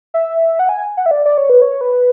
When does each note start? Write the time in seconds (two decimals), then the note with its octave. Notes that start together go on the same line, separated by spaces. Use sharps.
0.14 E5
0.59 F#5
0.69 G#5
0.97 F#5
1.06 E5
1.11 D5
1.26 D5
1.38 C#5
1.50 B4
1.62 C#5
1.81 B4